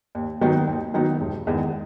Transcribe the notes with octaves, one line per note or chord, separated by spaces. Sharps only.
D#2
D#3 F#3 B3 D#4
D#2
D#3 F#3 B3 D#4
E1
E2 D#3 G#3